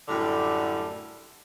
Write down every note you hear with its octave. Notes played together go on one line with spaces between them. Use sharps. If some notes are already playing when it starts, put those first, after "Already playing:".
F#2 A2 D3 G3